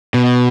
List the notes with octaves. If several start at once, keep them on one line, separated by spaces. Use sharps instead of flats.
B2